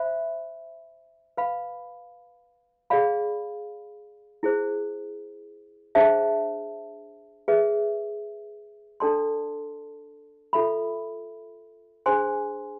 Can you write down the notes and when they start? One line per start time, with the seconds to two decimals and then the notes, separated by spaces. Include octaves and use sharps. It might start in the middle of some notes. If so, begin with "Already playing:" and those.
Already playing: C5 E5 B5
1.37 B4 F5 B5
2.90 G#4 D5 F5 B5
4.43 E4 G#4 C5
5.95 D4 G#4 C5 E5 A5
7.48 G#4 B4 E5
9.00 D4 A4 D5 A5 C6
10.53 F4 A4 E5 B5
12.06 D4 G#4 C5 G#5 C6